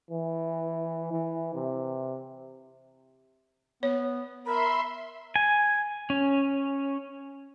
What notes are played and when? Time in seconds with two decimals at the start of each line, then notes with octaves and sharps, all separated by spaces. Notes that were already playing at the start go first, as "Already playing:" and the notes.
0.11 E3
1.12 E3
1.55 C3
3.83 B3 C#5
4.47 A#4 E5 B5 C6
5.36 G#5
6.10 C#4